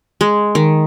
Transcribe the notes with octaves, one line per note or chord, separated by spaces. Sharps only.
G#3
D#3